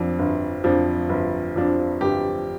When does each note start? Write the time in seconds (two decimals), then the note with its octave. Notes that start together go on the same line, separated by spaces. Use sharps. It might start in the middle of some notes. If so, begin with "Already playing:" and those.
Already playing: F2 F3 D4
0.19 G1
0.64 F2 F3 D4
1.09 G1
1.56 F2 F3 D4
2.01 G1 G4